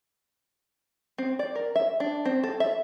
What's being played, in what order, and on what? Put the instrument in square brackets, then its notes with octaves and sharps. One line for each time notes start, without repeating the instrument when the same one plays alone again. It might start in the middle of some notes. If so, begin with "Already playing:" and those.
[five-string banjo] C4
D5
A#4
E5
D4
C4
A4
E5